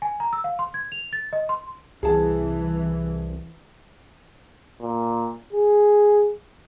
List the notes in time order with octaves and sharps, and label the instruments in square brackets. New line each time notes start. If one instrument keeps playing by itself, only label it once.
[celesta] G#5
A#5
E6
F5
C6
G#6
F7
A6
D#5
C6
[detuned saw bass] C2 [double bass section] E3 [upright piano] G#4 A5
[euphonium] A#2
G#4